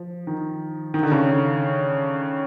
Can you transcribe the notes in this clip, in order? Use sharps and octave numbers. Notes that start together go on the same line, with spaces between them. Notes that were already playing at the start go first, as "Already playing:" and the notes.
Already playing: F3
D#3
D#3
D3
C#3